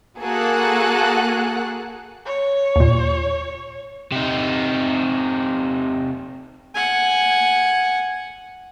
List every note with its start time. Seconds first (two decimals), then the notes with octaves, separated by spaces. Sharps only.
0.19 A#3 F#4 G#4 A4 F#5 F#6
2.26 C#5
2.76 D#2 A#2
4.12 C3 D#4
6.75 F#5 G#5